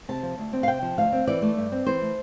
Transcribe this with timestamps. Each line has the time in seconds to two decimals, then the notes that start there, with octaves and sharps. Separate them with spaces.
0.09 C3 A5
0.23 F3
0.38 D2
0.53 C4
0.63 F5
0.68 C3 G5
0.82 F3
0.97 D2 F5
1.13 C4
1.27 E3 D5
1.42 A3
1.57 G2
1.72 C4
1.86 E3 C5
2.01 A3